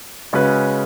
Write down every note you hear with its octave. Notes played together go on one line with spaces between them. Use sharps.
C#3 G#3 C#4 F#4 B4